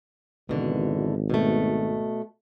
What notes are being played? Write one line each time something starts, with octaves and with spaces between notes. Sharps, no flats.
G#1 B2 D3 E3
B2 A3